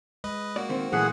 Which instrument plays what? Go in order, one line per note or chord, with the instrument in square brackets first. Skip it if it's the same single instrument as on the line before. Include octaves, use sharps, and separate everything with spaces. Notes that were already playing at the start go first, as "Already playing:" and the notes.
[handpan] G#3 [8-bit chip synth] B4 D#5
[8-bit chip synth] A#3 F#4 [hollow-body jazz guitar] D5
[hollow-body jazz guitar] D#3 C4
[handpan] A#2 F#3 C5 [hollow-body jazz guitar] E3 A3 [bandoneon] G#4 F#5